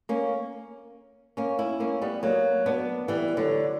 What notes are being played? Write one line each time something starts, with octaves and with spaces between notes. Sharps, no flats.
A#3 C#4
A#3 C#4
C#4 E4
A#3 C#4
G3 B3
F#3 A#3
B3 D4
E3 G3
D3 F#3